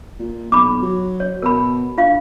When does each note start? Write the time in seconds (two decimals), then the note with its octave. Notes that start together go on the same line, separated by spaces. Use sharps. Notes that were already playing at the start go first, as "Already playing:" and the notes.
0.19 A#2
0.52 B1 B5 D6
0.82 F#3
1.20 C#5
1.42 B2 A#4 B5
1.98 D3 F4 F5